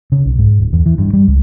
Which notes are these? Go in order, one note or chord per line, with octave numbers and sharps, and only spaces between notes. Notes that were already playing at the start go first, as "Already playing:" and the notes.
C#3
B1
G#2
D1
E2
E3
G2
G3
C#2